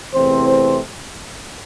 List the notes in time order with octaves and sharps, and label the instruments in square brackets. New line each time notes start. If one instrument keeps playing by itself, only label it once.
[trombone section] E2 C3 E3 A3 C4 C5
C5